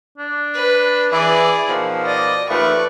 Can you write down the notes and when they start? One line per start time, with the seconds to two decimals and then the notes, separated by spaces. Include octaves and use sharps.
0.18 D4
0.54 B4
1.12 E3 E4 G#4 D5
1.68 B2 D#3 F3
2.05 D5 D#5
2.49 D#2 F3 A3 B4 D5 C#6